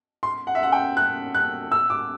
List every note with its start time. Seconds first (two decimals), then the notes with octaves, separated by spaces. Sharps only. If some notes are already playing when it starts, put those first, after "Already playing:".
0.23 C6
0.47 F#5
0.55 E5
0.63 F#5
0.72 G5
0.97 F#6
1.35 F#6
1.72 E6
1.90 D6